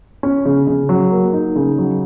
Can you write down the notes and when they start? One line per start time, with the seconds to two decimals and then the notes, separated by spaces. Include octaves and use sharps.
0.23 C#4
0.45 C#3
0.67 C#3
0.89 F#3
1.12 A#3
1.33 D#4
1.56 C#3
1.78 F#3